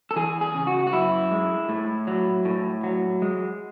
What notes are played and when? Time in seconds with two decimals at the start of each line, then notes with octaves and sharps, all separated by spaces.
0.11 A4
0.16 E3 G#4
0.41 G#4
0.55 C#3
0.67 F#4
0.87 F#4
0.93 F#2 E4
1.31 G#3
1.69 A2
2.07 F#3
2.45 A2
2.83 F#3
3.22 G#3